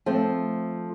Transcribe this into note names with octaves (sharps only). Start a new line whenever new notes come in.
F3 A3 C4